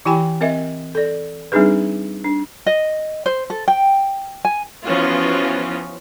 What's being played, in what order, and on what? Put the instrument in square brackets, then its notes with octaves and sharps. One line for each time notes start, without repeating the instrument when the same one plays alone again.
[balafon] E3 E4 G4 G5 G#5 B5
C4 A#4 D#5 E5
A4 D5
G3 C4 D4 D#4 G#4 B4
D4
[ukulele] D#5
C5
A4
G5
G#5
[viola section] E3 F3 B3 C#4 F4 F#4